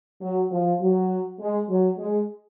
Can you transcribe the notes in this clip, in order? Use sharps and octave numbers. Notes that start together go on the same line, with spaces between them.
F#3
F3
F#3
G#3
F#3
G#3